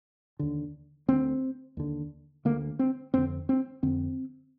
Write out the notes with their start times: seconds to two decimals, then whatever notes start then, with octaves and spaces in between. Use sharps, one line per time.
0.39 D#2 D3
1.08 D2 D3 C4
1.77 D#2 D3
2.45 D2 D3 A#3
2.79 C4
3.14 F2 D3 C4
3.49 C4
3.83 F2 D3 C4